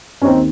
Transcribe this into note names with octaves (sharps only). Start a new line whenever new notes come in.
C#4
D#2 D#3 C4 D#4